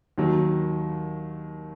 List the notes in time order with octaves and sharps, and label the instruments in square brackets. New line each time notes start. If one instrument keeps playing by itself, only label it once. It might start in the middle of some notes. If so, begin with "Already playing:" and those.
[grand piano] D#2 D#3 F#3